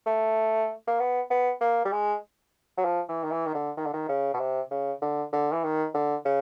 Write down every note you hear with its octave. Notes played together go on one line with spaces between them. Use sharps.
A3
A#3
B3
B3
A#3
G3
G#3
F#3
F3
E3
D#3
E3
D#3
D3
D#3
D3
D#3
C#3
B2
C3
C#3
D3
D3
E3
D#3
D3
C#3